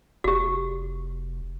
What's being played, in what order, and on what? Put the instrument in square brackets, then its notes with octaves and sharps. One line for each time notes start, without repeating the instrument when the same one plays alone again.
[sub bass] F1 [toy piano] F#4 G4